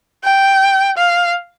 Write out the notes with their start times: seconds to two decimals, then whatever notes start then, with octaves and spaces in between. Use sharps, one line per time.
0.24 G5
0.97 F5